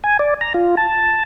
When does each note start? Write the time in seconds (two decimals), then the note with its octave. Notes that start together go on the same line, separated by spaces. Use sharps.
0.04 G#5
0.19 D5
0.41 A#5
0.54 F4
0.77 A5